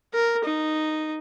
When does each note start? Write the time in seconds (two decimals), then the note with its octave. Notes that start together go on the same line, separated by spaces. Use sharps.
0.14 A#4
0.45 D#4